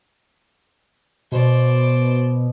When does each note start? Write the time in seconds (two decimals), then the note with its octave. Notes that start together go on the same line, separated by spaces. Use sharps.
1.32 B2 C5 D5